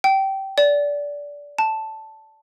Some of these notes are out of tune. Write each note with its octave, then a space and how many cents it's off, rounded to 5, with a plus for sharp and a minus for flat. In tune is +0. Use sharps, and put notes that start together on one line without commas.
G5 -20
D5 -20
A5 +0